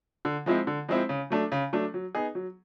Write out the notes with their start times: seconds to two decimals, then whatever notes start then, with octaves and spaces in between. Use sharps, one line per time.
0.25 D3
0.46 F3 G#3 C4 E4
0.67 D3
0.89 F3 G#3 C4 E4
1.09 C#3
1.30 F#3 A3 D4
1.52 C#3
1.73 F#3 A3 D4
1.94 F#3
2.15 B3 D#4 G#4
2.35 F#3